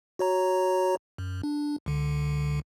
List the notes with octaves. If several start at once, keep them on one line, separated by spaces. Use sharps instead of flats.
F#4 C#5 A#5
F#2
D4
C#2 D3